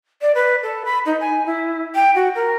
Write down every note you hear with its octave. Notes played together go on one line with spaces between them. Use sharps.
D5
B4
A4
B5
D#4
G#5
E4
G5
F#4
A#4